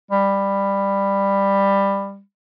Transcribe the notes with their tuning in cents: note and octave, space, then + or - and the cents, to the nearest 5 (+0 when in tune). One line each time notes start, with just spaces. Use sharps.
G3 +15